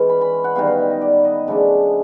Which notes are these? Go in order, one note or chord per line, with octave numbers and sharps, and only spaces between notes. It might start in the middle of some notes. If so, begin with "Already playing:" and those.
Already playing: E3 G#3 C#4
B5
B5
F#5
D#3 G3 B3 F5
F5
E5
D#5
D5
D#5
C#3 F3 A3 D4